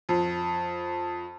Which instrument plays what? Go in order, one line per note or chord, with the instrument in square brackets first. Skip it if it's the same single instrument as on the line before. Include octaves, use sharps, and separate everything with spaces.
[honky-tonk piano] F2